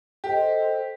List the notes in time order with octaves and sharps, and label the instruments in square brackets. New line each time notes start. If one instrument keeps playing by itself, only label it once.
[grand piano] G4 [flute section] A4 C5 D#5